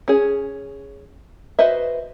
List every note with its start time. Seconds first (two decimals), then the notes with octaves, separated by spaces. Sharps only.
0.08 C#4 G#4
1.59 F#4 B4 C5 D#5 E5